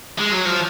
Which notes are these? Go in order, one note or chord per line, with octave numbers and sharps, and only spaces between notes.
G#3
F#3
F3